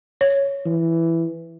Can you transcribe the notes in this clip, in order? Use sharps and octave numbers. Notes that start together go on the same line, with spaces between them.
C#5
E3